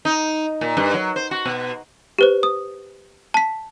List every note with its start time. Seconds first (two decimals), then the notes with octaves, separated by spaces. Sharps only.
0.05 D#4
0.61 A#2
0.77 G2
0.94 F#3
1.16 C5
1.31 F#4
1.45 B2
2.19 G4 B4 C5
2.43 D#6
3.34 A5 B6